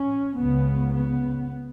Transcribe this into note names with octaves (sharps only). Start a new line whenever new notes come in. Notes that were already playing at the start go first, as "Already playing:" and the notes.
Already playing: C#4
C#2 C#3 B3
B3